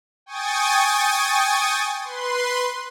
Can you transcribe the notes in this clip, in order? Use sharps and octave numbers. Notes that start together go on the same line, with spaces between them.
G5 G#5 C#6 D#6 A6
B4 C6